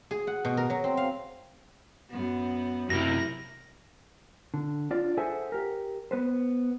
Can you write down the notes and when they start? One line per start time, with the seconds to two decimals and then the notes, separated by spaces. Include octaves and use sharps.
0.11 G#4
0.27 F#5
0.45 B2
0.57 A#4
0.70 F#3
0.84 C4
0.97 F5
2.10 F#2 B3
2.90 F#2 C3 E4 G4 A#4 A#6
4.54 D3
4.91 D4 F4 D5
5.17 G#4 A4 C5 E5 F#5 G#5
5.52 G4 A#4
6.11 B3 B4 C5